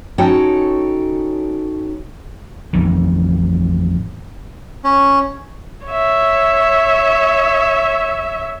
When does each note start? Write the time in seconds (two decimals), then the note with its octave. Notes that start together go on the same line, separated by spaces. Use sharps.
0.18 C#4 D#4 F#4 A4 C#5 G5
2.73 A1 F2 D#3
4.84 C#4
5.86 C#5 E5